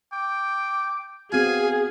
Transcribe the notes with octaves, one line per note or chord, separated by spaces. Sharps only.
G5 D6
B3 C4 F#4 G#4 F5 G#5